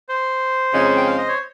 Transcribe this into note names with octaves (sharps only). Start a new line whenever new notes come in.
C5
F2 C#3 G#3 D#4
G5
F5
D#5
C#5